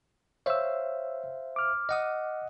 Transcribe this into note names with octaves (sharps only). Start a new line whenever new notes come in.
C5 C#5 E5 F5 E6
D6 F6
D#5 F#5 D#6